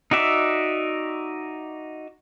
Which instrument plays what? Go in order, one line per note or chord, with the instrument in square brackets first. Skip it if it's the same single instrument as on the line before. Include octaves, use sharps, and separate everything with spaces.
[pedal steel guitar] D#4 F#4 D5 E5